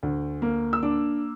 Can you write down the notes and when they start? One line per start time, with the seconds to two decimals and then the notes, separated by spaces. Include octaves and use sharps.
0.03 D2
0.42 A#3
0.73 E6
0.83 D4 D6